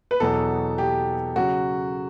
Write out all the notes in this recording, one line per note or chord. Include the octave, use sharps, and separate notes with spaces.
B4
E2 B2 F#3 B3 A4
G4
C#3 F#3 F#4